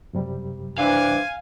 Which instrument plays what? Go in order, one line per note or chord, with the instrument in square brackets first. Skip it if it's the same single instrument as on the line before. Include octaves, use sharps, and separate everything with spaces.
[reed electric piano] F#2 C3 G3
[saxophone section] E3 C4 D4 [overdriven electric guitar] F5 [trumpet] G#5